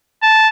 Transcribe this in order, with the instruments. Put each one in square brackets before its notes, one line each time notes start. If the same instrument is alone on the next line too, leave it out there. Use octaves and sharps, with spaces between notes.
[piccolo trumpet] A5